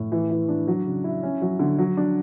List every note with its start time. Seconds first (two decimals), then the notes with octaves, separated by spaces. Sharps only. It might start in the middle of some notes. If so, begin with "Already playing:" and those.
Already playing: A2
0.12 E3
0.31 E3
0.49 D4
0.67 F#3
0.86 C#3
1.04 E4
1.23 C#4
1.42 F#3
1.59 D3
1.78 F#3
1.97 D4